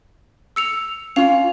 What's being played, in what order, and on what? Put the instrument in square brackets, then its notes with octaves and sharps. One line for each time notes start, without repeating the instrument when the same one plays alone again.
[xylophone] E6 C#7 F7
[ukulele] C#4 F4 [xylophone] F5 F7